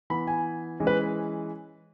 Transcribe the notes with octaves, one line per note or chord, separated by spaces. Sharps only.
E3 B3 B5
G#5
E3 G#3 C#4
B4